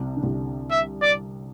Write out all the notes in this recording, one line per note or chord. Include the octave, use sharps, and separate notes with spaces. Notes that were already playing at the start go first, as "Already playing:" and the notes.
Already playing: C2 C3
D3
C2 C3
E5
D5